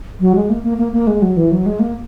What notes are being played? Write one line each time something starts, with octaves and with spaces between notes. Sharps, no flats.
F#3
G#3
A#3
A#3
A#3
A#3
G#3
F#3
E3
F#3
G#3
A#3